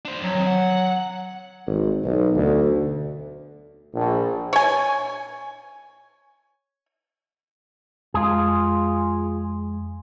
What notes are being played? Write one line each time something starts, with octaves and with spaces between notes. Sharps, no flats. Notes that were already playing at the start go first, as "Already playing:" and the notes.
D4 C5
F2 F#3
D#3 C4
F#5
G#1
B1
D2
A#1
C#5 G#5
F2 G#3 F4 G#4